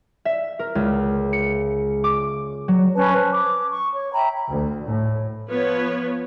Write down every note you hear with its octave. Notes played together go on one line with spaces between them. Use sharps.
E5
A#4
C#2
C#7
D6
F#3
C#4 B4 A5 B5
B4 C5 A5
D6
C#6
C#5
E5 G5 A#5 B5
D2
A2
F3 B3 B4 C#5